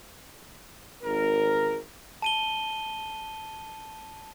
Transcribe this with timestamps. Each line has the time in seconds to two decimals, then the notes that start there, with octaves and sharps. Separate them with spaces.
1.04 G#1 A#4
2.22 A5 D#7 G7